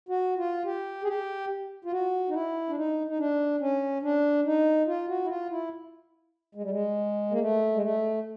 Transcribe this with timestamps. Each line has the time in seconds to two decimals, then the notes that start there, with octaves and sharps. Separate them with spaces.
0.09 F#4
0.37 F4
0.65 G4
1.03 G#4
1.07 G4
1.85 F4
1.91 F#4
2.29 D#4
2.34 E4
2.69 D4
2.76 D#4
3.07 D#4
3.18 D4
3.60 C#4
4.03 D4
4.45 D#4
4.87 F4
5.08 F#4
5.24 E4
5.29 F4
5.50 E4
6.55 G#3
6.63 G3
6.71 G#3
7.31 A#3
7.40 A3
7.75 G#3
7.82 A3